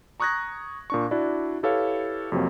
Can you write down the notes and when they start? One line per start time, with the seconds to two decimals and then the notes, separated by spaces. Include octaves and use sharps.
0.20 A#5 C#6 D#6 F#6 G#6 A#6
0.90 A#2 D4 C#6
1.11 D4 E4 F#4 D5
1.63 E4 G4 A4 B4 C#5 F5
2.32 F2 C3 F#3 A#3 C4